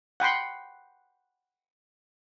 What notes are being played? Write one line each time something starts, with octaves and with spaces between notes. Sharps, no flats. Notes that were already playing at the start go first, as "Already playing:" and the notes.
F#5 G5 B5 C6